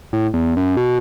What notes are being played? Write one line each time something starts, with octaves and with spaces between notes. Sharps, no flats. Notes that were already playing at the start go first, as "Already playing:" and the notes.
A2
E2
F#2
B2